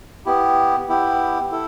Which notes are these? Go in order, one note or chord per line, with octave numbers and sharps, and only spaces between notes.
B3 E4 G4
B3 E4 G4
E4 A4